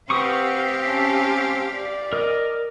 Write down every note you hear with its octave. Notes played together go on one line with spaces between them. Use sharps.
C4 G4 B4 F5 F#5 C#6 D#6
C#4 A5
D5
A#4 D#5